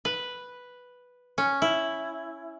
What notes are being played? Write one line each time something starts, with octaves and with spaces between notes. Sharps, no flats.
B4
C#4
E4